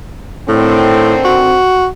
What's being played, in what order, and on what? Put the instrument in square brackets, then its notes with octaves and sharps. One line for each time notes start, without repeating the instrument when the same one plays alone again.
[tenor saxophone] A2 [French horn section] D3 D#3 C4
[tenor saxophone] F#4